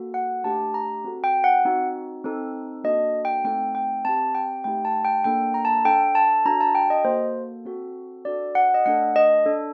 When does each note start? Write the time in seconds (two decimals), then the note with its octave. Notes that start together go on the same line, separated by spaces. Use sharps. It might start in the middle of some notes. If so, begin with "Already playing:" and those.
Already playing: A#3 F#4 A4
0.14 F#5
0.44 A3 D4 G4 A5
0.74 A#5
1.04 C4 F#4 A4
1.24 G5
1.44 F#5
1.65 C4 D#4 F#4
2.24 C4 D#4 A4
2.84 A#3 D4 F#4 A4 D#5
3.25 G5
3.44 A3 C4 D#4 A4 G5
3.75 G5
4.05 C4 G4 A5
4.35 G5
4.64 A3 D#4 G4 G5
4.85 A5
5.05 G5
5.24 A#3 D4 A4 G5
5.54 A#5
5.65 A5
5.85 D4 A4 G5
6.15 A5
6.45 D4 F#4 A4 A#5
6.61 A5
6.75 G5
6.90 D#5
7.05 A#3 F#4 A4 C5
7.65 C4 F#4 A4
8.25 D4 F#4 A4 D5
8.55 F#5
8.74 D#5
8.86 A3 D4 A4 F#5
9.16 D#5
9.46 D4 A4